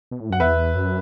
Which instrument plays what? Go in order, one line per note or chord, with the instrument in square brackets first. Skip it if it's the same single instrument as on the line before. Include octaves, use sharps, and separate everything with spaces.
[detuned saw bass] B2
A2
[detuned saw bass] F#2 [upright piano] F#5
[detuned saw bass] E2 [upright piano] B4 E5
[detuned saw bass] F#2